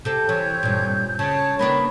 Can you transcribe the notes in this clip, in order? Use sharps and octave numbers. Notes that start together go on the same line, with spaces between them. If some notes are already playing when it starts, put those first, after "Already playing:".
C3 A4 G6
E3 C4 C#5
G2 A#2
C#3 C#5 A5
D#3 A#3 B3 D4 C#5 B5 C#6